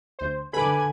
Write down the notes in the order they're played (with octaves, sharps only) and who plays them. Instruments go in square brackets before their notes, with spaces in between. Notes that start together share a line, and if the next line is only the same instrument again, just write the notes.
[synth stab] D2 C5
[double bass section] D3 [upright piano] A4 B4 [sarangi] G#5 [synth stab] B5 D6